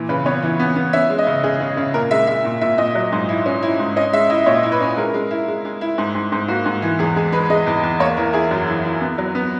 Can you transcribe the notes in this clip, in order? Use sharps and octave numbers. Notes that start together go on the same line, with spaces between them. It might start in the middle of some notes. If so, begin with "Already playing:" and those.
Already playing: A#2 E3
C#3 B4
B3 C#5
E3
B3
B3
C#4 E5
G#3
D#5
C#3
C#3 G#4
C#3
C#3
A#2 A#4
G#3 E5
G#3 E5
A#2
A#2 E5
A#2 D#5
F#3
G#2
E4
C#4
E4
G#2
C#4 D#5
G#3 E5
E4 D#5
A#2 C#5
E4
B4
C#4
G#3 A#4
G#3
E4
G#3
G#3
E4
G#2
G#2
G#2
A#3 F#4
G#2
E3
E2 G#4
G#3 G#4
G#3 B4
G#3 D#5
E2
E2
A#3 C#5
E3 A#4
E4 G#4
F#2
E3
E4
B3
F#3
B3